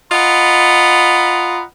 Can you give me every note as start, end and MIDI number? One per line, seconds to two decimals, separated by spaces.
0.12 1.63 65
0.12 1.63 75
0.12 1.63 78
0.12 1.63 82
0.12 1.63 83